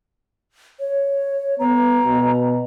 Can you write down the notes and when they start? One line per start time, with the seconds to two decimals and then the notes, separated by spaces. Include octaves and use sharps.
0.80 C#5
1.59 B3 A#5
2.05 B2